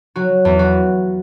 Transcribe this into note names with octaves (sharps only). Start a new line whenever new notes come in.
F#3 F#4
E2
F#4